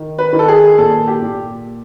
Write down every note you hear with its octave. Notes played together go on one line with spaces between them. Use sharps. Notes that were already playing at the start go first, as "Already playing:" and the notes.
Already playing: D#3
B4
D#3
A4
G#4
A#2 A4
G4
A#2